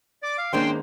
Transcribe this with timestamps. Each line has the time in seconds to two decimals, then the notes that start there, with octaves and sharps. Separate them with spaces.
0.23 D5 D6
0.38 F5
0.53 D#3 G#3 A#3 C#4 D4 C5 G5 C6